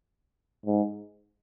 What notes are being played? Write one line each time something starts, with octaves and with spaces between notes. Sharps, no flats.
G#2